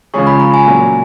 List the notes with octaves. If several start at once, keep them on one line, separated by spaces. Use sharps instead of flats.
C#3 F3 G#3 C#4 G#4 C#6
B5
A#5
G#5
A#2 F#3 C#4